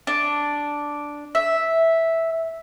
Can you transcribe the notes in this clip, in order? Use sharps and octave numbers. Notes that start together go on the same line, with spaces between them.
D4
E5